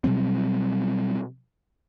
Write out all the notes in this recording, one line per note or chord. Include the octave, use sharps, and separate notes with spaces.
B2 F#3 G3 C4